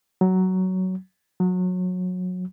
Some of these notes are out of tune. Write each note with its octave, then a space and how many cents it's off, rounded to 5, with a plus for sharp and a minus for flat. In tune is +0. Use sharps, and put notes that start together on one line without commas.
F#3 +10
F#3 -25